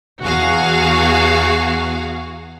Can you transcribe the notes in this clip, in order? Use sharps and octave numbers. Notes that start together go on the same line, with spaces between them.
E2 F#4 G#4 F5